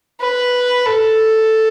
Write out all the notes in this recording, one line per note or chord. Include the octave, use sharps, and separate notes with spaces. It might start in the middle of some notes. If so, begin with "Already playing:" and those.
B4
A4